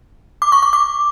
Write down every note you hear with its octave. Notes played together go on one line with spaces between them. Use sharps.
D6
C#6
C#6
D6